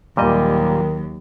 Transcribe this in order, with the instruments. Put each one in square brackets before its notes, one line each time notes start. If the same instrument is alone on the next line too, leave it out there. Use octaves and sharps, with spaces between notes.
[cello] D#2 F#3 [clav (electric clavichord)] A#2 G3 D#5 [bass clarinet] D#3